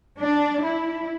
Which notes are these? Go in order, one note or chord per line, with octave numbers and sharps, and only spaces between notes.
D4
E4